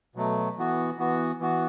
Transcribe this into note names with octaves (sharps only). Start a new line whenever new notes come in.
B2 F#3 A3
E3 B3 F#4
E3 B3 F#4
E3 B3 F#4